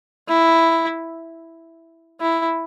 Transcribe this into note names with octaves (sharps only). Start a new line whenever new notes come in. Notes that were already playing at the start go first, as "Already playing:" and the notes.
E4
E4